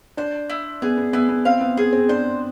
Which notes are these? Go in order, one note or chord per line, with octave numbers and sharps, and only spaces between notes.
D4 C5
E4
B3 G#4
B3
B3 E4
B3
C4 F5
B3
B3 G#4
C4
D4 C5